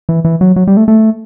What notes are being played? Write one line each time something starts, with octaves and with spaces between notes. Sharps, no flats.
E3
E3
F#3
F#3
G3
A3
A3